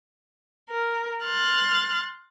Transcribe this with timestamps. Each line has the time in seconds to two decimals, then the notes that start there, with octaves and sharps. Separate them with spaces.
0.69 A#4
1.25 C6 F6 F#6 A6